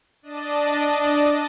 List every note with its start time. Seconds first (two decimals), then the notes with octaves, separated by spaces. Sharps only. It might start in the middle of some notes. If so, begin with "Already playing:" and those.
0.22 D4 D5 D#5 A5 D#7